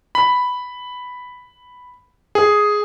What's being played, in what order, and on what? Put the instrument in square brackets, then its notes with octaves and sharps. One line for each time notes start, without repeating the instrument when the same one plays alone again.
[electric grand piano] B5
G#4